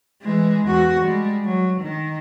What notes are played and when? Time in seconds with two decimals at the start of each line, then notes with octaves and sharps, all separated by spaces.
0.23 E3 G#3
0.64 E2 F#4
1.02 G3 G#3
1.45 F#3
1.81 D#3